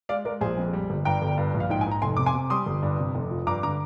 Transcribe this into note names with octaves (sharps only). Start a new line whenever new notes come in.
G#3 D5 F5
G#3 A#4 D5
A#1 G#4 C5
F2
G3
G1
G2 G5 A#5
G1
G2
A#1
F5
G#2 G5
G#5
G#2
A#5
F1 G#5 C6
C3 D6
G#5 C6
C3
G3 C6 D#6
G1
G2
C3
F1
F3
G2 A#5 D6
D3 A#5 D6